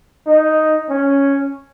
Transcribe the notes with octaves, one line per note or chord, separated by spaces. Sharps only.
D#4
C#4